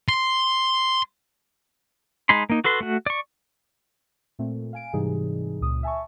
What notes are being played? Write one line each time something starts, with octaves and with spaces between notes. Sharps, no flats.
C6
G#3 D#4 B5 C6
A#3 D#4
F#4 A4 B4 C6
A3 F#4
D5 C#6
A#2 A3 C4
F5 G#5 D7
G#2 C3 E3 G3 D#4 G#4
C#2 A#2 D#6
E5 G#5 A5 C#6